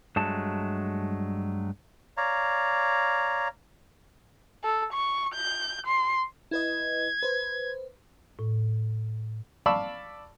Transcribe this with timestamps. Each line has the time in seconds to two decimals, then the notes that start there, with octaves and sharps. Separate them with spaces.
0.16 G2 F#3 G#3 A3 A5
2.17 C#5 D5 F5 A#5
4.64 A4
4.93 C#6
5.35 G6
5.87 C6
6.51 E4 B4 D#5 G#6
7.23 B4 C5
8.39 A2
9.66 D5 F5 A5 B5 C#6 E6